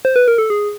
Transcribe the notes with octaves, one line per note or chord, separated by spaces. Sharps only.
C5
B4
A#4
A4
G#4